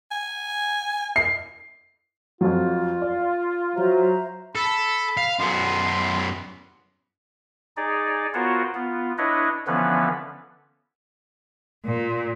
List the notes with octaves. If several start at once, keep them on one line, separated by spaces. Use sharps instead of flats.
G#5
C7
F2 F#3 F4
D5 F5
F#3 C5 E5 A#5
A4 B5
F5
F#2 B3 C6
D#4 G#4 D5
B3 F4 F#4 A#4 C5 C#5
B3 F4
D4 E4 B4 C#5 D#5
D3 E3 F3 B3 C#4 B4
A#2